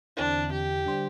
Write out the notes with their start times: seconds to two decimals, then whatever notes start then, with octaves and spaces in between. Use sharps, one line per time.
0.17 E2 D3 C4 D4 E4
0.52 G4
0.86 D3 G3 D4 C5